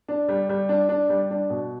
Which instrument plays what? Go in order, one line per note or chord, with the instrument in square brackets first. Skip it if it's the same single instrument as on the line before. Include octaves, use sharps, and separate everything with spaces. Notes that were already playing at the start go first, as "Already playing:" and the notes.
[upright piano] D4
G3
G3
D4
D4
G3
D4
B2